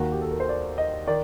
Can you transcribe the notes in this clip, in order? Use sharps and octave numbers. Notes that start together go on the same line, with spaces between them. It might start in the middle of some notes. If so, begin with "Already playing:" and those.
Already playing: D#2 D#3 F#4
G4
A4
A#4
C5
D5
D#5
D#3 D5